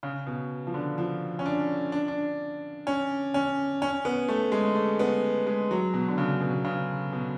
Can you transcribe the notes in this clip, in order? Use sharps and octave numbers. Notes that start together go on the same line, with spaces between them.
C#3
B2
F3
D3
F3
C#4
D4
D4
D4
C#4
C#4
C#4
B3
A3
G#3
A3
B3
G#3
F#3
B2
D3
C#3
B2
B2
C#3
B2